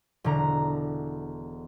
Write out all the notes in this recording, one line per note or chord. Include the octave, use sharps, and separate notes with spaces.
E1 D3 A#5